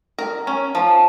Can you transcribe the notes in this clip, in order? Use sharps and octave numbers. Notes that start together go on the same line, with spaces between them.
A#4
C#4
F3